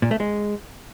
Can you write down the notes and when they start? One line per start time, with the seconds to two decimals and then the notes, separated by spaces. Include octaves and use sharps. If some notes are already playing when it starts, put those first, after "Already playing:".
0.02 A#2
0.11 A3
0.20 G#3